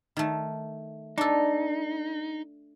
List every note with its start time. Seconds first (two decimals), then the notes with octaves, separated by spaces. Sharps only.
0.17 D#3 A3
1.18 D4 D#4 A4